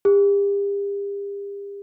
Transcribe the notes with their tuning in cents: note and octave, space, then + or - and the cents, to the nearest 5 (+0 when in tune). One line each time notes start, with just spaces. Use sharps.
G4 +40